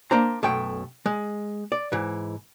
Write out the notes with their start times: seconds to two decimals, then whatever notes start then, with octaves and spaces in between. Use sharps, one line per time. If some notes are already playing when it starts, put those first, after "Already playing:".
0.11 A#3 D4 C5 A#5
0.43 B1 F#2 A3 G5
1.06 G#3
1.72 D5
1.92 G#2 E3